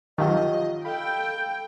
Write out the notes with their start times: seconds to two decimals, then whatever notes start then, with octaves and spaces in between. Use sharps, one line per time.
0.18 D#3 F3 F#3 F4 G4 D#5
0.85 A4 F5 G5 B5